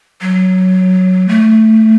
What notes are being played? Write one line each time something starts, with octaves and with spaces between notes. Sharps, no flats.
F#3
A3